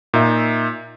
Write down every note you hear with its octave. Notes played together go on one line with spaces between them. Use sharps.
A#2 D#4 E5